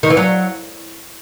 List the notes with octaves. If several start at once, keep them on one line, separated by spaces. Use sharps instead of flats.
D#3
E3
F#3